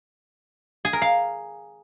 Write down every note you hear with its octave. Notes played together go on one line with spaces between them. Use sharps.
G#4
A#4
F5